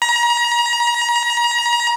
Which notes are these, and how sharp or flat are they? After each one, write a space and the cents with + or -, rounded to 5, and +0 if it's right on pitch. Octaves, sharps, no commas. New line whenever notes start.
A#5 +35